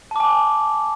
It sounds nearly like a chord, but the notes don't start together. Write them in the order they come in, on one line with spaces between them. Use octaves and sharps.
A5 D6 G#5